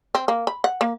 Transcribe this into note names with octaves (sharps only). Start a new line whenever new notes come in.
C4
A#3
B5
F#5
A#3